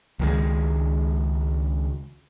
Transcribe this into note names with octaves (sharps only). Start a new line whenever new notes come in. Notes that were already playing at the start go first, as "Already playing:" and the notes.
C#2 D#3 G#3